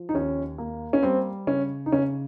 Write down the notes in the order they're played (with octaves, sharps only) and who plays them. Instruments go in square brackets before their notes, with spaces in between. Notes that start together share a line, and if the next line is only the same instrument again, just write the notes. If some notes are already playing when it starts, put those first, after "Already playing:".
Already playing: [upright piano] F3
D#4
D#2 C#4
A#3
C#4
G3 C4
C#3 C#4
D#4
C#3 C#4